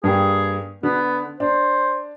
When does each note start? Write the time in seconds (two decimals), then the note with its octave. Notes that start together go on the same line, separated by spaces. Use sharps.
0.04 G2 A#3 G4 G#4
0.83 D3 B3
1.40 D4 C5